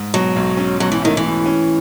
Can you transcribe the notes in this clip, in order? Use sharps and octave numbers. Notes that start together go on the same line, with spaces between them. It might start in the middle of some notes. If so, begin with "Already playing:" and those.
Already playing: G#2
B2 F#3
B1
C#4
B2 F#3
E3
D#3 A3
E3
A3
C#4